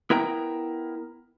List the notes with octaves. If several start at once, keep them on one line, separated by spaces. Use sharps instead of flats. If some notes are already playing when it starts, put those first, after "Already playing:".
B3 E4 A#4 G5 G#5 A#5